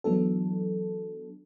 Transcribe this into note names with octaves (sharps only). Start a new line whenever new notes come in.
E3 F#3 B3 D4 A4